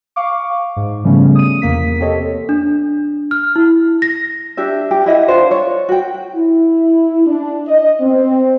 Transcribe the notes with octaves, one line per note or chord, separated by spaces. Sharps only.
F5 C#6 D6
G#2
C#3 F3 G3 A3 B3 C#4
D#6 D#7
E2 C3 A#3 B6
C4 G4 A4 C#5 D#5
D4
F6
E4
A#6
D4 G4 E5
G4
E4 D#5 E5 F#5
D4 F4 C5
C#5
F#4 G5
E4
D4
D#5
C4